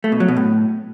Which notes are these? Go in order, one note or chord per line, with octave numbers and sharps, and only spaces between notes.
A3
B2
F#3
B2
A2